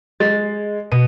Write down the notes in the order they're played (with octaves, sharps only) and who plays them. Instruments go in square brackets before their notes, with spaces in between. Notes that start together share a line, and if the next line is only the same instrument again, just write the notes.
[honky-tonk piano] G#3 [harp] A6
[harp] B2 D#7